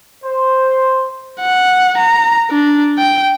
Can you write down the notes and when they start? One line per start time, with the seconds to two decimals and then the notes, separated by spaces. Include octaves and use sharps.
0.23 C5
1.40 F#5
1.98 A#5
2.51 D4
2.98 G5